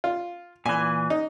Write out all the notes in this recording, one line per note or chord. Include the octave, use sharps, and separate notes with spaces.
F4
A#2 E3 G#5
D#4